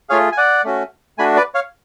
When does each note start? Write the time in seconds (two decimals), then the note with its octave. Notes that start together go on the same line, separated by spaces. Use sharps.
0.09 A3 F4 G#4 C#5 F5
0.32 G#5
0.37 D5 F#5
0.64 A3 C#4 F#4
1.18 A3 D4 F#4 G#5 B5
1.36 B4 D5
1.54 C#5 F5